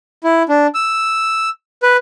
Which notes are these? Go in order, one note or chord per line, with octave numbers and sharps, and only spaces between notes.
E4
D4
E6
B4